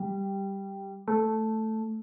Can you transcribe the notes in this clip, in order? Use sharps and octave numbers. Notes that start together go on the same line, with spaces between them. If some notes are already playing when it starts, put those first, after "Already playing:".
Already playing: G3
A3